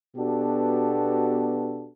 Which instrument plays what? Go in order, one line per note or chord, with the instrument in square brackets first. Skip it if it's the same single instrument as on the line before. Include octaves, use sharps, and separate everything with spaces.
[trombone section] B2 B3 D4 F#4 G4 A4